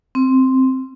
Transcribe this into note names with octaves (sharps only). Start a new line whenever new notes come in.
C4